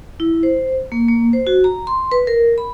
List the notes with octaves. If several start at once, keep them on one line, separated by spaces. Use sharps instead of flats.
E4
C5
A#3
A#3
C5
F#4
A#5
C6
B4
A#4
B5